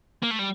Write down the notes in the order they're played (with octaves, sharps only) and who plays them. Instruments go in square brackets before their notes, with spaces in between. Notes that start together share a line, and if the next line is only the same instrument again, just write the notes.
[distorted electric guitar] A#3
A3
G3